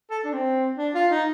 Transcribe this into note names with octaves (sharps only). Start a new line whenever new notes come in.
A4
D4
C4
D4
F4
D#4